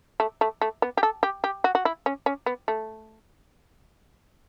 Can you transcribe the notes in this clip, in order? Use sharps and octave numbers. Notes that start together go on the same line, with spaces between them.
A3
A3
A3
B3
G4
A4
G4
G4
F#4
F#4
E4
C#4
C#4
B3
A3